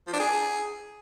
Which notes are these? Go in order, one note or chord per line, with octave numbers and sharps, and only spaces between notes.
F3
D4
G#4